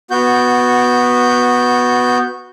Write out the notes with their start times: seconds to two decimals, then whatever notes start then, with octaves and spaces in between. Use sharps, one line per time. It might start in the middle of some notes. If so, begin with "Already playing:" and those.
0.11 B3 F#4 G6